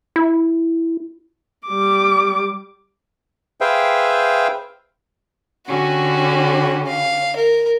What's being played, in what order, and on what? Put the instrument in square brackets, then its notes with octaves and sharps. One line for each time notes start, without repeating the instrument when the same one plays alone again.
[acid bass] E4
[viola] G3 D6
[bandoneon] G#4 B4 C5 E5 F5 G5
[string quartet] D3 C#4 G4 [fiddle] F#4
[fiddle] F5
A#4